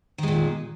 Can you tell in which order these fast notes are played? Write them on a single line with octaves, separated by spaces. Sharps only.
D#3 G#3 A#2